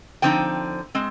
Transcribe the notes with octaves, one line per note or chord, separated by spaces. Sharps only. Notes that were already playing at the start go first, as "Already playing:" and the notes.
D3 F3 C4 D#4 G5
G#3 C4